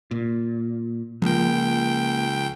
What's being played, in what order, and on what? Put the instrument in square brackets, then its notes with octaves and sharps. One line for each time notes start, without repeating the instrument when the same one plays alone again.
[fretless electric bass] A#2
[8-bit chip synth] C#2 G5 [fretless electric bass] F3 A#3